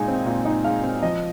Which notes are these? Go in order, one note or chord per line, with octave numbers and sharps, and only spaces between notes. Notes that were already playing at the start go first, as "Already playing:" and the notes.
Already playing: A#2 G#3 D#4 G#5
C4
A#2
D#4
G#3 F5
C4
F3 D#5